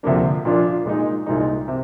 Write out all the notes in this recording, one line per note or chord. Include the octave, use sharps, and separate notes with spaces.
D2 C3 F3 A#3 D4
A#2 F3 A#3 D4 F4
A#2 G#3 D#4
C2 A#2 G#3 D#4
C3